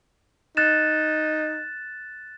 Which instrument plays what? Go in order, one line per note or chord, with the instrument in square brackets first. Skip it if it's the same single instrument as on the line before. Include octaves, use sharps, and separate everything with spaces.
[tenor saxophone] D#4 [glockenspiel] F#6 A6 E7